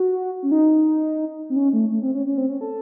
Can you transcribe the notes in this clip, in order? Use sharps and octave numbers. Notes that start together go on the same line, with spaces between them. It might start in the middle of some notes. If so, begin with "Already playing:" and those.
Already playing: F#4
C#4
D#4
C4
C#4
A3
A3
C4
C#4
C#4
C4
C#4
A4